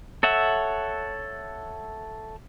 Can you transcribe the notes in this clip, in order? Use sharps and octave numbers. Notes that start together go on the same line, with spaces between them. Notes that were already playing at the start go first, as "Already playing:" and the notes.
A4 C#5 E5 F#5